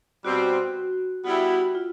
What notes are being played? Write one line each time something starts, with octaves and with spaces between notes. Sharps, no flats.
B2 G3 C4 F#4
G3 B3 E4 F#4 G4
F#4
F4